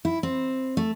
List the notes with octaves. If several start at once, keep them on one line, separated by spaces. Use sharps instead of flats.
E4
C4
A3